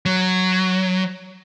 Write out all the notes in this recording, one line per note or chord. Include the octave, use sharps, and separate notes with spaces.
F#3